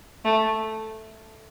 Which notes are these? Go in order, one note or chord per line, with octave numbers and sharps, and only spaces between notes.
A3